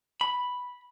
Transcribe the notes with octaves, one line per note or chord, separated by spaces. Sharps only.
B5